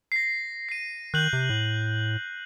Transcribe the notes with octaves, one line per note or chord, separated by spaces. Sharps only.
A#6 C7
C7 D#7
D#3 F#6 G6 F#7
C3
A2